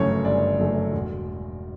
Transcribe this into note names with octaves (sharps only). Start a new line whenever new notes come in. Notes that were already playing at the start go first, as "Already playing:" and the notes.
Already playing: G1 F#2 C#3 E3 A3 C#5
G1 D5
F#2 C#3 E3 A3
E1